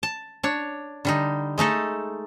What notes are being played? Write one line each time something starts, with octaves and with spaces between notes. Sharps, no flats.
A5
D4 C#5
D3 G3 D#4
G#3 A3 D#4 A4